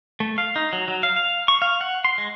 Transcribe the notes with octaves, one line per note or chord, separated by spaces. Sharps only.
A3
F5
D#4
F#3
F#3
F5
F5
C#6
F5
F#5
C6
G#3